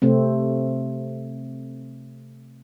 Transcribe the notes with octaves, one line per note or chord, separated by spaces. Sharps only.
C3 A3 C4